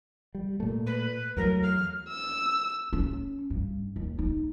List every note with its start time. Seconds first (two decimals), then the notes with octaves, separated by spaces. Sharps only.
0.35 G3
0.60 A#2 A3
0.86 B4
1.37 E2 F#3 A3 A#4
1.62 F6
2.08 E6
2.93 C#4
3.50 G2
3.96 D#2
4.19 D#4